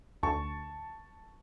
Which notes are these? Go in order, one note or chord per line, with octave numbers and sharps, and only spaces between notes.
D2 A5 C#6